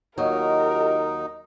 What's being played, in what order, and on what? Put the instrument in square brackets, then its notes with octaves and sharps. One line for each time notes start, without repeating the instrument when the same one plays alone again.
[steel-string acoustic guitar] D#2 F#3 [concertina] D#4 [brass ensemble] F4 G4 D#5 [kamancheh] A#4